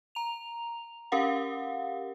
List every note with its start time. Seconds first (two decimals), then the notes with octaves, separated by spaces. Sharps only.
0.15 A#5 F7
1.12 C#4 G4 A#4 F5 F#5